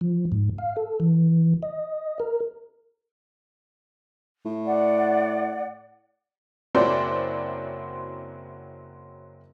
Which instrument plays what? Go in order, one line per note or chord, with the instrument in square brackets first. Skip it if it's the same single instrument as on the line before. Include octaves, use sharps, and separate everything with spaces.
[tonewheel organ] F3
G#2
F5
A4
E3
D#5
A#4
[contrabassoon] A2
[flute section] D5 F#5
[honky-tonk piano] F#1 F#3 C4 E4 C5 D5